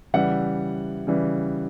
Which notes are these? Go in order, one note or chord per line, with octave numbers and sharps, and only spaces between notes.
C#3 E3 G3 E5 F#5
C#3 E3 G3